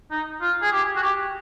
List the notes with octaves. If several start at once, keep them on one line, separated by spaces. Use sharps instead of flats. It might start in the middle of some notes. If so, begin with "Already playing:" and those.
D#4
F4
G#4
G4
F#4
G4